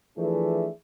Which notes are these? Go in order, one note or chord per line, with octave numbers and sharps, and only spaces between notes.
E3 F3 A3 D4 E4 G#4